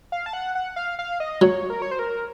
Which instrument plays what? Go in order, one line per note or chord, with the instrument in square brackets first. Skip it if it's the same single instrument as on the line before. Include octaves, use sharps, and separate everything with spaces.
[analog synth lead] F5
A5
F#5
F#5
F5
F5
D#5
[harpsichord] F#3 [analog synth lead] C#5
[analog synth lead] A#4
C#5
C5
A#4